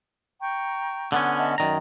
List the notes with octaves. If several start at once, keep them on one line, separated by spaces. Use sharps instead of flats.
G5 A#5 C#6
D3 B3 C#4
D#5 E5 A5
F#2 D#3 D5 A#5